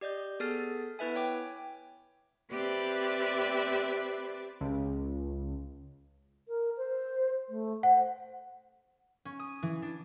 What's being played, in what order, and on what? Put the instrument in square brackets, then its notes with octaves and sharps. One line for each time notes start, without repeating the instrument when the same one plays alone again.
[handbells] G4 D5 D#5 G6
B3 G#4 A4 F6 A6 C7
B3 E4 B4 E5 G#5
C#5 G5 D6
[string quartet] C4 G4 B4 D5 E5
[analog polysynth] C#2
[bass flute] A#4
C5
A3
[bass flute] C5 [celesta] F#5
[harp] C#4
D#6
E3
D4